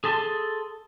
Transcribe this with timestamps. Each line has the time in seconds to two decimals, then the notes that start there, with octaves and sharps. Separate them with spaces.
0.04 G#4 A4 A5 C6